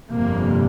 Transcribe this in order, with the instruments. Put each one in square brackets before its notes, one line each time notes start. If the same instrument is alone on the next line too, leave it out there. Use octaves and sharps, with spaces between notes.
[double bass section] G1 F2 C3 A#3